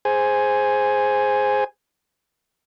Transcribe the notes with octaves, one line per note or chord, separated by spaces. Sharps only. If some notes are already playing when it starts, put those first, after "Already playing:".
G#4 C5 G#5